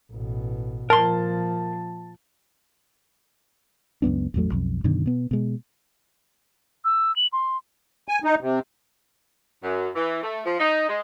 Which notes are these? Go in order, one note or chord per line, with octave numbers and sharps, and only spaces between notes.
A1 B2
A#2 F3 A#4 A5 C6
C#2 F#2 B3 D4
A1 E2 F#3 A3
B1 F2
F#2 B2 D3 D#3
B2 B3
B2 G#3
E6
F#7
C6
G#5
D#4
C3
F#2
E3
A3
F3
D#4
G#3